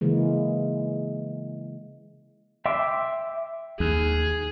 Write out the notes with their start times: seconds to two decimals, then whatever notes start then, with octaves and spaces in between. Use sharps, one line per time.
0.01 C#3 E3 G#3 A#3
2.66 E5 G5 C6 D6 E6
3.80 D#2 G#4